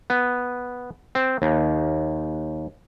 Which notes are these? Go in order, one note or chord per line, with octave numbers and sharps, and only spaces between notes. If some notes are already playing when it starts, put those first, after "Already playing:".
B3
C4
D#2